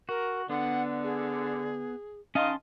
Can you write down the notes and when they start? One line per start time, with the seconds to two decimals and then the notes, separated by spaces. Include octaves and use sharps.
0.09 F#4 A#4
0.49 D3 B3 F#5
1.03 G#4
2.35 D#3 C#4 D#5 F5 A5 C6